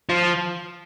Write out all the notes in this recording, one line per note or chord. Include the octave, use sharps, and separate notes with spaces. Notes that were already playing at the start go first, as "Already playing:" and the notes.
F3